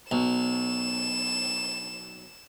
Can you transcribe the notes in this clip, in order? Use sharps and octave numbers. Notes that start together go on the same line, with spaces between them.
B1 E7